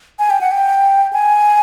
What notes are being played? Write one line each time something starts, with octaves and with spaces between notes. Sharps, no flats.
G#5
G5
F#5
G5
G#5